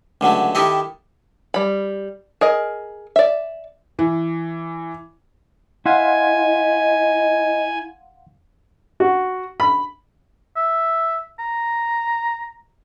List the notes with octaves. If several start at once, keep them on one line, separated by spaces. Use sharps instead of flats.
C#2 D3 F#3 A3
D#3 E4 G4 A4 D#5
G3 B5
G#4 A#4 D#5
D5 E5
E3
E4 D#5 F5 F#5 G#5 C6
F#4
B5
E5
A#5